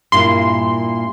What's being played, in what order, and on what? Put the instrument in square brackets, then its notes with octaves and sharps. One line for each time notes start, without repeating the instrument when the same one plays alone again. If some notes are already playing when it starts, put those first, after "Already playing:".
[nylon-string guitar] G2 A#2 E4 [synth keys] C6